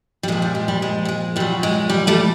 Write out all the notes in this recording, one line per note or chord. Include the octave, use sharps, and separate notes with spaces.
G3
A#2 F3 G#3
G3
G#3
G3
G#3
G3
G#3
A#2 F#3 G3
G#3
G3
G3 A3